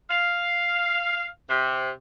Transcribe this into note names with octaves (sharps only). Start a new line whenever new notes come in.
F5
C3